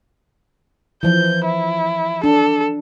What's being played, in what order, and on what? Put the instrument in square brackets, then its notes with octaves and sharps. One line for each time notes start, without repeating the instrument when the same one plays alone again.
[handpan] E3 F3 [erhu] G6
[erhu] E4
[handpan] D4 [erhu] A4